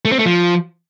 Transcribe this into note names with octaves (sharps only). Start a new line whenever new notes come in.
A3
C4
A3
F3